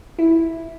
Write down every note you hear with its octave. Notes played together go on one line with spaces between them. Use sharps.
E4